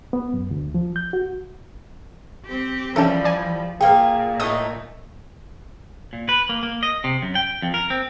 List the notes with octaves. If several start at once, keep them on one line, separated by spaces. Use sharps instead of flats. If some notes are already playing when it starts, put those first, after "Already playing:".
B3
F#2
D2
F3
G6
F#4
C4 G4
E3 F3 G3 C#4 A4 A#4 A5
D5 G#5
A#2 A#3 G#4 B4 G5
A2 A3 D#4 D#6
A#2
B4
A#3
A#3
D#5
C3
F#2
G5
F2
A#4
C4